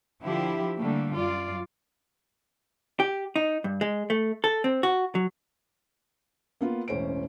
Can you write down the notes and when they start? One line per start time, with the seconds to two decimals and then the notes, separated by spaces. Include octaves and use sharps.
0.23 D3 F3 E4 G4
0.77 D3 G3 A3 A#3
1.15 F#2 F4 D5
3.00 G4
3.36 D#4
3.64 G2
3.81 G#3
4.10 A3
4.44 A4
4.64 C4
4.83 F#4
5.15 F#3
6.61 A#3 B3 F4
6.88 E1 A1 C#4 C5 D7